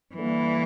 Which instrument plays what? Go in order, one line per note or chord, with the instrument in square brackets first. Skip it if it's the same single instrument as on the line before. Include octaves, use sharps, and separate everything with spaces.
[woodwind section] D3 G3 A#3 [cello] E3